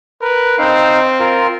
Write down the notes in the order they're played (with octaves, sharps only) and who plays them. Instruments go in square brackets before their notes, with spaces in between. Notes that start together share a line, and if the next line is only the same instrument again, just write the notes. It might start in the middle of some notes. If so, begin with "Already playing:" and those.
[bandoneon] A#4 [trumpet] B4
[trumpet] C4 [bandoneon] D#4 F5
[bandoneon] F4 A#4